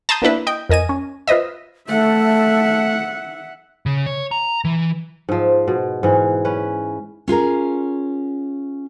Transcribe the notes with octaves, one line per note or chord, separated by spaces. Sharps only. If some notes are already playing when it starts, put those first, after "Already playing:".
A5 A#5 C6 D#6 G6
A#3 B3 D4 E4 B4
D#5 G5
F2 A#4 D#5 G#5 D#7
C#4
F4 B4 C5 D#5 E5
A3 E5 F#5
C#3
C#5
A#5
E3
G#2 F3
B2
G#2 E3
C#4 B4
C#4 F4 G#4 A#4